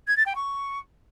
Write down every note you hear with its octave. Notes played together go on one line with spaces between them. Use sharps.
G#6
A6
G5
C#6